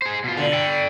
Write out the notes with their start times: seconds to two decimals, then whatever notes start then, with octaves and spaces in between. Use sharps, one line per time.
0.02 G#4 C5
0.24 B2 F4
0.37 D3
0.53 A4 G5